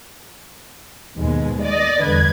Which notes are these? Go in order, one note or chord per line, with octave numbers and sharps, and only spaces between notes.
D#2 G#2 B2 G#3
D5 D#5 A6
E2 G2 D3 B4 G#6